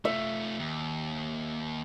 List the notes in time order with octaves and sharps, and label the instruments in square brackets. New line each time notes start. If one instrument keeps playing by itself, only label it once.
[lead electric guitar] A3 F4 [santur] E5
[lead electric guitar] D#2